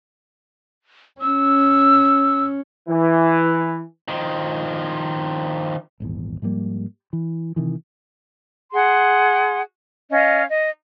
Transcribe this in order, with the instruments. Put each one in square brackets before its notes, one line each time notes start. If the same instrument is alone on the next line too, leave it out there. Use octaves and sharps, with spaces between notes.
[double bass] C#4 [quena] E6
[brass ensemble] E3
[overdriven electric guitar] D#3 F3
[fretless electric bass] D#1 G#1 E2
G#2 F3 G3 A#3
E3
C3 D#3 E3
[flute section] G#4 F#5 C6
C#4 D#5 F5
D#5